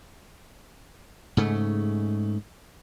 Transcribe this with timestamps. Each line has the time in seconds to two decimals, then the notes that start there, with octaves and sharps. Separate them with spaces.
1.37 G#2 C#3 A3